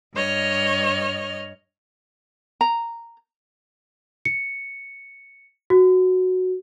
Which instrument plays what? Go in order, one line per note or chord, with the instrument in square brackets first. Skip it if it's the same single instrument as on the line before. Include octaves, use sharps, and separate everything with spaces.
[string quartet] G2 C#5 D#5 F6
[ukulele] A#5
[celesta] C#7
F#4